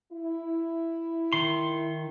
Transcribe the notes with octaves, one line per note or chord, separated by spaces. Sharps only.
E4
D#3 C6